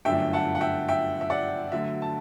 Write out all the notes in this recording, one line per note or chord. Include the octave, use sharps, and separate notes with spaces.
G1 F#2 D3 A3 D4 E5 G5
F#5 A5
F#5
E5 G5
E5 G5
E5
D5 F#5
D2 D3 F#3 E5
A5